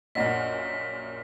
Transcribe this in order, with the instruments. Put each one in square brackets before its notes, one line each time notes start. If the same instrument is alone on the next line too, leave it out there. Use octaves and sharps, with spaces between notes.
[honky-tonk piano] A#1 F#2 A#2 [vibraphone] C#5 [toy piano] D#5 F#5 [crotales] B6